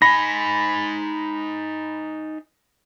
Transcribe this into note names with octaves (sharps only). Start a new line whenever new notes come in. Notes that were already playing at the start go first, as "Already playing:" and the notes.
D#4 G#5 B5 A#6